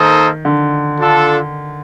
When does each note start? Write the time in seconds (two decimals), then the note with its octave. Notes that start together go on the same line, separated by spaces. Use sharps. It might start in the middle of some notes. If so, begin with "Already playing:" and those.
Already playing: D#3 A#3 D#4 A4 C5 D#5
0.45 D3
1.00 D4 F4 A4